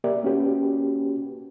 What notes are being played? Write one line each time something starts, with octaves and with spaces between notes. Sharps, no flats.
A#3 G4 A#4 D5 E5
A#3 C#4 F#4 G4 B4